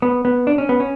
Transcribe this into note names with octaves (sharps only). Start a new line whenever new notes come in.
B3
B3
D4
C#4
B3
C#4